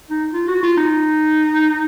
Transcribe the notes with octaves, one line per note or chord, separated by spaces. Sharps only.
D#4
F4
F#4
F4
D#4